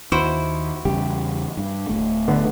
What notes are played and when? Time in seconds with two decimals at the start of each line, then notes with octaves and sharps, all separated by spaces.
0.12 D#2 E4 F#4 C5
0.85 E2 C#3 G3 G4
1.57 G2
1.89 D1 F2 A3
2.28 D3 B3